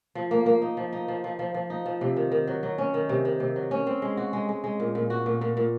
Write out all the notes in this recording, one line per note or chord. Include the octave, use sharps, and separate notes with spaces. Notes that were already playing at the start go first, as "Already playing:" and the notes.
F3
A#3
A#3
D#4
F3
D#4
F3
F3
F3
F3
D#4
F3
C3
D#3
D#3
F#3
F#3
C#4
D#3
C3
D#3
C3
F#3
C#4
C4
G#3
F#4
G#3
G#3
G#3
A#2
A#2
F#4
A#2
A#2
A#2